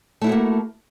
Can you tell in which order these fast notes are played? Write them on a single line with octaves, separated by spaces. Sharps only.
A3 E4 F#4 C4 A#3